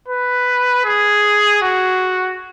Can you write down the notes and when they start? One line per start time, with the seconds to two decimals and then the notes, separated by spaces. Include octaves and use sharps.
0.08 B4
0.85 G#4
1.62 F#4